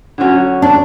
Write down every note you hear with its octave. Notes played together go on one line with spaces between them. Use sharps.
D3 F#3 C#4 F#4
D4